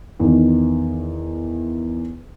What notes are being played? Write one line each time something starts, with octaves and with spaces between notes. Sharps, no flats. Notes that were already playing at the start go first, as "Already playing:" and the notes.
E2 D#3